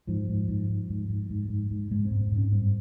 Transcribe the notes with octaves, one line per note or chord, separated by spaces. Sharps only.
G#2 F3
G#2
G#2
G#2
G#2
G#2
G#2
G#2
G#2
G#2 G#3
C4
G#2
C4
G#2 C#4
G2 C4